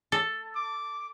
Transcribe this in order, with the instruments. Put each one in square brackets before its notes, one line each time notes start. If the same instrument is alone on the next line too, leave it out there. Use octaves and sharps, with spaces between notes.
[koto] A4
[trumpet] D6